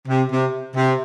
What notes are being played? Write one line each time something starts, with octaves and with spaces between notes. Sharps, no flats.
C3
C3
C3